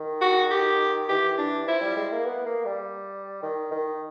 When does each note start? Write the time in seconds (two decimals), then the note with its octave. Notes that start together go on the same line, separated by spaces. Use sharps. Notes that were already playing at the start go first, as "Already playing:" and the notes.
Already playing: D#3
0.21 F#4
0.51 G4
1.09 E3 G4
1.38 E3 D4
1.67 F3 E4
1.82 G3
1.97 G#3
2.12 A#3
2.26 B3
2.46 A#3
2.65 G3
3.43 D#3
3.71 D#3